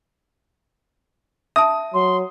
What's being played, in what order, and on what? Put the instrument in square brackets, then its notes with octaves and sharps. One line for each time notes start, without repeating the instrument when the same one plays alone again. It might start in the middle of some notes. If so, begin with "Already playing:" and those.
[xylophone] E5 A5 [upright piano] D#6
[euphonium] F#3 [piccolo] C6